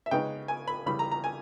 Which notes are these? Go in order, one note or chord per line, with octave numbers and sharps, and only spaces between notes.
E5
C#3 G#3 B3 D#4 G5
G#5
B5
C#3 E3 G3 B5
A#5
A#5
G#5